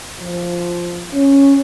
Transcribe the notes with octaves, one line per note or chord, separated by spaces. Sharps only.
F3
C#4